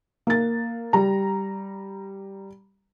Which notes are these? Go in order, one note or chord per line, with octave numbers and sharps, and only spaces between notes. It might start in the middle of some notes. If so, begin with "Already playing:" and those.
A#3 A6
G3 A#5